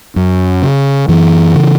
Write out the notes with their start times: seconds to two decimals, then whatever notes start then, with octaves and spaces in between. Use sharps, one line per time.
0.16 F#2
0.62 C#3
1.08 F#2 E3
1.54 C#3